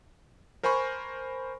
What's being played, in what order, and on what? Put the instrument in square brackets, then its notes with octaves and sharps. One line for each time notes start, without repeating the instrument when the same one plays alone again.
[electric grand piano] A#4 C5 G#5 B5 C#6